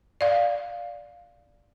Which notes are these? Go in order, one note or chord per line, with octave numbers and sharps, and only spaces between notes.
D5 F5